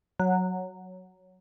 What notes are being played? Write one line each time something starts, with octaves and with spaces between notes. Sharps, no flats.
F#3